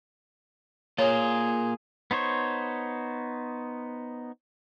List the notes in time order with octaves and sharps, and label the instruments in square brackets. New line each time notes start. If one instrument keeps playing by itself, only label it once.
[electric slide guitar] A#3 F4 [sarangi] G#4 [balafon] C#5
[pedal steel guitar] B3 D#4 C5 C#5